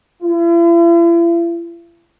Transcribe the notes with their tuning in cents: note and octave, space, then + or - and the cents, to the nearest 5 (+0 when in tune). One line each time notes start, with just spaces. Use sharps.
E4 +45